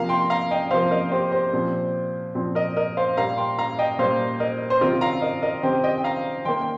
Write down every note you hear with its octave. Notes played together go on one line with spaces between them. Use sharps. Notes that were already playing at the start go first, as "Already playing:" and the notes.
Already playing: C3 F3 A#3 F5 A#5
G5 C6
F5 A#5
D#5 G5
C3 F3 A#3 C5 F5
A#4 D#5
G4 C5
G4 C5
A#2 F3 C4
A#2 F3 C4
A#4 D#5
A#4 D#5
C5 F5
A#2 G3 A#3 F5 A#5
G5 C6
F5 A#5
D#5 G5
A#2 G3 A#3 C5 F5
A#4 D#5
C5
C3 D#3 C4 F4 A#4
F5 A#5
A#4 D#5
A#4 D#5
C3 D#3 C4 G4 C5
D#5 G5
G5
F5 A#5
D#3 A#3 G5 C6
G5